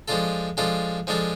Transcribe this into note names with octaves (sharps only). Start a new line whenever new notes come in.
F3 G#3 D4 F4 A4
F3 G#3 D4 F4 A4
F3 G#3 D4 F4 A4